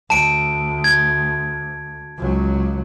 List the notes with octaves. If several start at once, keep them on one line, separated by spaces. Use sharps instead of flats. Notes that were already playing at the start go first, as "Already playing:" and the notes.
D2 A5 D7
G#6
C#2 F#3